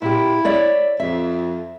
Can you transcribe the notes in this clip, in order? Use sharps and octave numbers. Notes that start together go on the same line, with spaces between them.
A#2 E4 G4
C#5 D5 E5
F2 E5